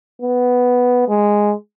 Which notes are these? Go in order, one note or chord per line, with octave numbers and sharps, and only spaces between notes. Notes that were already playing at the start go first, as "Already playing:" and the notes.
B3
G#3